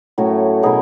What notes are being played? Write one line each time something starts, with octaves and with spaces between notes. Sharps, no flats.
A2 F#3 A3 C#4
B2 F#3 B3 E4 G#4 A#4